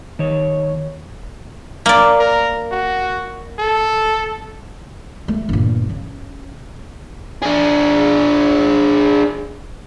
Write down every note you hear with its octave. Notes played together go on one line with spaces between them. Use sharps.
D#3 C#5
A#3 D5
A#4
F#4
A4
A3
G1 A#2
C#3
D4 G#4